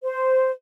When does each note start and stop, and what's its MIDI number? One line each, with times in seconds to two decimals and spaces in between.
0.03 0.51 72